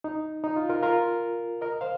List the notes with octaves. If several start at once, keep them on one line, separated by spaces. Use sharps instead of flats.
D#4
D#4
F4
F4 A#4
F4 A#4
A#4 D#5
C5 F5